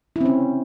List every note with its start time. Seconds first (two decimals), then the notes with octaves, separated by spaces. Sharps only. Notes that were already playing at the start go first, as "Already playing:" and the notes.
0.16 E4
0.21 C4
0.25 C#4